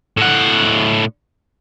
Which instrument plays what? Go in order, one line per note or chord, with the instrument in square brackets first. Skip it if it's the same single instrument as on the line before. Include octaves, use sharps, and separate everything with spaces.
[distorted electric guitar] A2 F#5